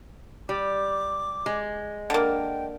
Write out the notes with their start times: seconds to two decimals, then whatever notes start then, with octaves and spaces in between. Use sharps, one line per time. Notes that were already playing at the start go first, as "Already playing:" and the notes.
0.49 G3 D6
1.46 G#3
2.10 D3 A#3 G5